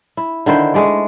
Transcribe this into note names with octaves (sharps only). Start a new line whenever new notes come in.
E4
D3 D#3 E4 C5
G#3 A3 D5